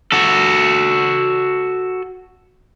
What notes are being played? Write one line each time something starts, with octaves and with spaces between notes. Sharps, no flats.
F#4 A4